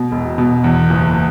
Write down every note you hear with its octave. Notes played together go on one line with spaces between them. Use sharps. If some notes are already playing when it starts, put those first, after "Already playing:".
Already playing: B2
E1
B2
E2
F#1